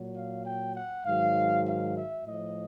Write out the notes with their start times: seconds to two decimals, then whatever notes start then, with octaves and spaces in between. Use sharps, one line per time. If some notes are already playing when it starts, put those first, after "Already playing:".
Already playing: A#2 F#3
0.15 F5
0.45 G5
0.75 F#5
1.05 G#2 D#3 F#3 F5
1.66 F5
1.96 E5
2.26 A2 F3 D#5